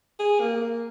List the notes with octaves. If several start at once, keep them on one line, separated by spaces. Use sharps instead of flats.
G#4
A#3
A#3